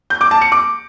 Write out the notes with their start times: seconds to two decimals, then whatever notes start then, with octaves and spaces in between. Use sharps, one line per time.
0.10 G6
0.21 D6
0.31 A5
0.41 C#7
0.52 D6